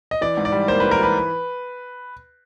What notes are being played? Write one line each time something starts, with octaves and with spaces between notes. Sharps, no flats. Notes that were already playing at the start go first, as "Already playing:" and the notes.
D#5
E3 D5
G#2
D5
G3
A#3 C5
E3 B4
A#4
E3 B4